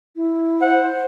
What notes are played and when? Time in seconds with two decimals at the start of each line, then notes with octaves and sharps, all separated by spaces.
0.16 E4
0.61 C5 F#5